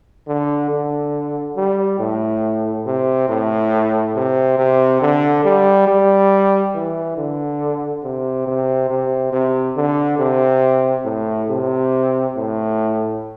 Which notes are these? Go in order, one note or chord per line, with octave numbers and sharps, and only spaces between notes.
D3
D3
G3
A2
C3
A2
C3
C3
D3
G3
G3
E3
D3
C3
C3
C3
C3
D3
C3
A2
C3
A2